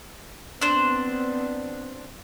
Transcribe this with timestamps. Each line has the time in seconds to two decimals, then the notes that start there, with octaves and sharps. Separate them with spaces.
0.61 B3 C4 D4 C5